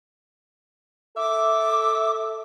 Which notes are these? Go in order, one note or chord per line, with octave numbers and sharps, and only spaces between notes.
A4 E5 D6